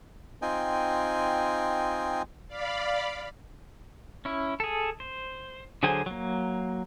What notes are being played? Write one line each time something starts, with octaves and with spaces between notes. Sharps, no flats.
C4 D#4 F4 D#5 G5 G#5
D5 F5 B5
C#4 E4
G#4 A4
C5
D3 F#3 G#4 C5 G#5
F#3 A#3